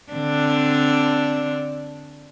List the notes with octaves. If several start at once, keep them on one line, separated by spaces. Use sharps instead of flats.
D3 C4 D4